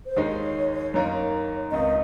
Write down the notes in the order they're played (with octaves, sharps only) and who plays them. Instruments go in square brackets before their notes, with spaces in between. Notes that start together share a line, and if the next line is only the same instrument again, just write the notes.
[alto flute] C5
[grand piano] D#2 D#3 G#3 D#4 [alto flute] C#5
[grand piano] F#2 D#3 A#3 D#4 A#4
[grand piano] C#2 C3 D#3 [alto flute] D#5